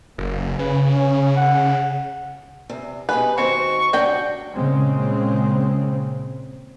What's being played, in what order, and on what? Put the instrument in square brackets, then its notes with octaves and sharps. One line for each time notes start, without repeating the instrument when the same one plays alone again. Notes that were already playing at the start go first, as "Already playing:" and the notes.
[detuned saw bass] F#1 [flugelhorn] A#3
[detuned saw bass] C#3 [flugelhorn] B4
[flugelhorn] C#4
F#5
[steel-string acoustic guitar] E2 C3
[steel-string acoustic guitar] B2 G4 G#4 [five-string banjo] B4
[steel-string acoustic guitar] D#2 F#4 C5 [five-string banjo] C4 [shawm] C#6
[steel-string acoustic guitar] C3 C#4 D4 [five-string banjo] F#4 G5
[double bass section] A#2 C#3 G#3 C4